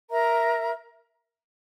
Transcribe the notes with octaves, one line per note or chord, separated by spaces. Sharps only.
A#4 E5 A#5